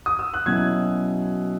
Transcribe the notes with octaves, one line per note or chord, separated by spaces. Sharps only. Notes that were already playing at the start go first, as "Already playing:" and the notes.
D#6
E6
F#6
B2 F#3 C#4 E4 G#6